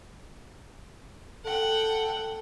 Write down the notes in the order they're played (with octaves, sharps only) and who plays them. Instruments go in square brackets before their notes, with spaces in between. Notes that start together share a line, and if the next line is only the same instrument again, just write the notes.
[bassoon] A4 [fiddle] F#5 G5